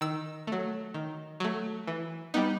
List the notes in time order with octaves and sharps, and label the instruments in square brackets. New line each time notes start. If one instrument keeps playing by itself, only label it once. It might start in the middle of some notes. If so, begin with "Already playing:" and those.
[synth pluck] D#3 E6
F#3 A3
D#3
F#3 A3
E3
G3 B3 D#4